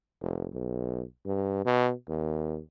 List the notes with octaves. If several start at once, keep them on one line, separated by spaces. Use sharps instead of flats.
F1
B1
G2
B2
D#2